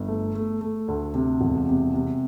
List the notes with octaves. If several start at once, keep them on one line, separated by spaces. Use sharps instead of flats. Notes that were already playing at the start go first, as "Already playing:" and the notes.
Already playing: G1
A3
A3
A3
D2
C3
E1
C3
C3